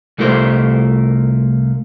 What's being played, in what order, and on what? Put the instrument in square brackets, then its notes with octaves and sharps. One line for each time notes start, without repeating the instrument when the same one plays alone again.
[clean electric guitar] C2 A3 F4 A#4 C5